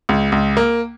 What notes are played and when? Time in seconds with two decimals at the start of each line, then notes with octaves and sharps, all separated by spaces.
0.09 C#2
0.32 C#2
0.57 A#3